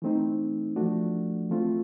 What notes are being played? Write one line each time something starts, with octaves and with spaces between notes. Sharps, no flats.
E3 A3 C4 D#4
F3 A3 D4 F#4
E3 A3 C4 F4